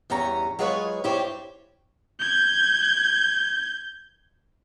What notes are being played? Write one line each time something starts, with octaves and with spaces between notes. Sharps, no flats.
E2 G2 C#4 A#5
F#3 G#3 F4 G#4 B4 C#5
G2 E4 G4 C5 C#5
G6 G#6